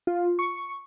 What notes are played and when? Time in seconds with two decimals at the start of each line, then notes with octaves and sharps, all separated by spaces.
0.07 F4
0.39 C#6